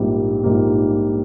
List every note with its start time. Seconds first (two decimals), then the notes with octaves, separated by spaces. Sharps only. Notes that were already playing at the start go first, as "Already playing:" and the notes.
Already playing: A#1 G#2 G3 A#3
0.43 A#1 G#2 G3 A#3